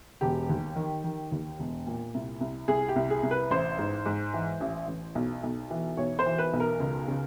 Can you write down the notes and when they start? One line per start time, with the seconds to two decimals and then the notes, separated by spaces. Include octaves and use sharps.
0.21 E1 G4
0.49 D#2
0.76 D#3
1.04 D#3
1.32 D#2
1.59 E1
1.87 A#2
2.14 C2
2.41 C2
2.68 C2 G#4
2.89 G4
2.96 C2
3.10 G#4
3.23 C2
3.31 B4
3.51 A1 C5
3.78 G#2
4.06 G#2
4.33 E3
4.61 A1
4.88 A1
5.15 B1
5.43 B1
5.70 E3
5.97 B1 C#5
6.19 C5
6.26 E3
6.38 B4
6.53 B1
6.60 A#4
6.80 C#2
7.08 C#3